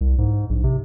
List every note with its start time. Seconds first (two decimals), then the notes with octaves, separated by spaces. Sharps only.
0.01 C2
0.18 G#2
0.50 A#1
0.64 C3